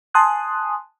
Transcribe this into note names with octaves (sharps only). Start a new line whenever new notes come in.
G#5 A5 C6 D#6 F#6